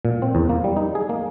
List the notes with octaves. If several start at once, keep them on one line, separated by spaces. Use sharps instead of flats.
A#2
C4
E2
A#3
G3
D#4
G#4
A#3